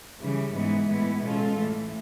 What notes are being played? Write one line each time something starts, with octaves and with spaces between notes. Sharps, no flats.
C#3 E3 G3
G#2 E3 G#3 B3
A2 E3 G#3 B3 E4
B2 G#3 C#4 F4 A4
A2 E3 A3